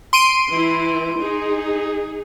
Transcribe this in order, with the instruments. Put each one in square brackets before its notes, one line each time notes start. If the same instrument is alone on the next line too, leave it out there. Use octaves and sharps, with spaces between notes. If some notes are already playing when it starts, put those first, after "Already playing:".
[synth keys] C6 D7 D#7
[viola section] E3 E4
D#4 G#4